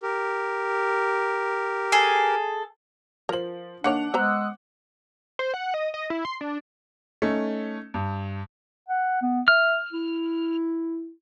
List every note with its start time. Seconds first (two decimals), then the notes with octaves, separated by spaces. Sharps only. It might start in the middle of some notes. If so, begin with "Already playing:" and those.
0.02 G4 A#4
1.92 G#4 A4
3.29 F3 A#4 C5 F#7
3.84 D#3 A#3 D4 C#5 F#5 D6 F7
4.14 G#3 B3 C5 A#5 D#6 E6 F#6
5.39 C5
5.54 F#5
5.74 D#5
5.94 D#5
6.10 E4
6.25 C6
6.41 D4
7.22 A3 C#4 D#4
7.94 G2
8.88 F#5
9.22 B3
9.48 E5 F6
9.92 E4